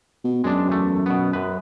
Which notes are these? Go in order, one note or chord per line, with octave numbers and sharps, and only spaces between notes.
B2
F#2 G#3 D4
E2 A3
B2 B3
F#2 B4